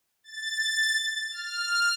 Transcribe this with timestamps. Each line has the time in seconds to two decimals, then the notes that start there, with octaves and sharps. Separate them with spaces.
0.24 A6
1.31 F6